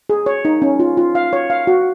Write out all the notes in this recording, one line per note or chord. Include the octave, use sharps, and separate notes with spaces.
G#4
C#5
D#4
C#4
F4
F4
F5
C#5
F5
F#4